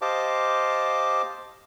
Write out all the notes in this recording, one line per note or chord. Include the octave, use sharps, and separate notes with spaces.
G4 C5 D#5 F5 A5 D6